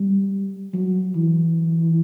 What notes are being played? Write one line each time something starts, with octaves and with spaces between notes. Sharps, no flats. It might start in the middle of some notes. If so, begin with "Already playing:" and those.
Already playing: G3
F#3
E3